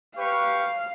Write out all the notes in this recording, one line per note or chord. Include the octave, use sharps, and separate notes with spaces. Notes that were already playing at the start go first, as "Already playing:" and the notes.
G4 B4 F5 C#6